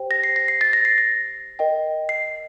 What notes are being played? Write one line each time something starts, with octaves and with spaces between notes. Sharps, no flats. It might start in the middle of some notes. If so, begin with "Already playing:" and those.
Already playing: G4 C5 G5
A#6
C7
A#6
C7
A6
A#6
C7
A#6
A#4 D#5 G5
C7